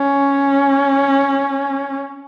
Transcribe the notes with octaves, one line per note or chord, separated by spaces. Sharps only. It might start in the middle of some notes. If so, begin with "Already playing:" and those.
Already playing: C#4